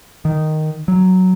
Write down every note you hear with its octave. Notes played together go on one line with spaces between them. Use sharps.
D#3
F#3